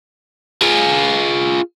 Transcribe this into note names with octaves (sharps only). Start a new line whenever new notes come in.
F4 G#4